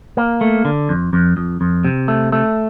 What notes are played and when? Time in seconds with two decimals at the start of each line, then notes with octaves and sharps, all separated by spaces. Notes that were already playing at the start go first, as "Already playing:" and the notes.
0.17 A#3
0.41 A3
0.65 D3
0.89 F2
1.13 F2
1.37 F2
1.61 F2
1.85 C3
2.08 A3
2.32 A3